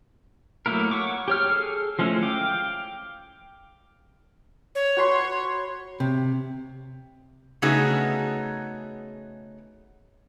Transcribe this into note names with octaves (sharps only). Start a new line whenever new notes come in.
F#3 A3 A#3 E4 A#4
C#5 F#5 C#6 D6
G4 C#5 F6
G#4 A4
F3 G#3 A3 C#4 E4
F5 G5 D6
C#5
F#4 B4 C6
C3
C#3 A3 B3 D#4 F#4 G#4